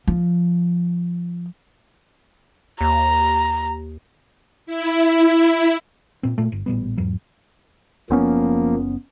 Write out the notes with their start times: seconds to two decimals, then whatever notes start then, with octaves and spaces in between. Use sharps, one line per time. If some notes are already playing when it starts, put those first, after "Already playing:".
0.07 F3
2.81 D#2 A#5
4.66 E4
6.23 A#2 C4
6.38 A#2 A3
6.52 G1
6.66 A1 A#2 G3 B3
6.97 E2 G#2 F#3
8.10 F#1 F3 A#3 B3 C#4